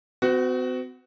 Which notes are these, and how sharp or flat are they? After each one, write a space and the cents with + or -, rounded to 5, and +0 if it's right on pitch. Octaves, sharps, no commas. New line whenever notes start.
C4 -45 F#4 +0 F#5 +0